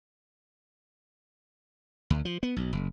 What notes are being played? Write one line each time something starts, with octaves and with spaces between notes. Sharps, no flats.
D2
F3
B3
B1
F#1